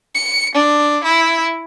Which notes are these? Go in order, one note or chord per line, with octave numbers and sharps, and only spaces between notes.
C#7
D4
E4